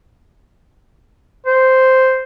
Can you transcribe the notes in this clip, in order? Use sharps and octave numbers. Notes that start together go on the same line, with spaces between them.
C5